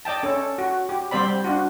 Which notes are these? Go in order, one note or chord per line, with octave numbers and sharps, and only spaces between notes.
D5 D#5 G5 A5
C#4 A4
F#4
G4
G3 C4 C5 D5 B5
D4 F4 F#4